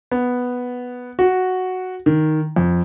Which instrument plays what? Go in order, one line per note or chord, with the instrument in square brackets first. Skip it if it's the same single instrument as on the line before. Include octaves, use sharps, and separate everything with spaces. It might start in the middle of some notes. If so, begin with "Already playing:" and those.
[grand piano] B3
F#4
D#3
F2